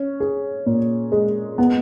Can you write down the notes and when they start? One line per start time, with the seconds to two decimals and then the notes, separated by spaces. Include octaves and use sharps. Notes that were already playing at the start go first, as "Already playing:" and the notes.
Already playing: C#4
0.20 G#4
0.66 A#2
1.12 G#3
1.58 B3